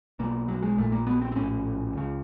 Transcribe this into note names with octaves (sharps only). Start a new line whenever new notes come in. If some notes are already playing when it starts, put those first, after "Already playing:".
B1 B2 A#3
F#3
G#3
A#1 A#2 A3
A#3
B3
C4
C4
A#1 A2 C#4
C#2 C#3